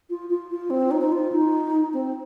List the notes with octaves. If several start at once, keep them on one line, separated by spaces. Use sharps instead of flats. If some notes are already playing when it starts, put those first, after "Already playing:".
F4
F4
F4
C4
D#4
D#4
F4
D#4
C4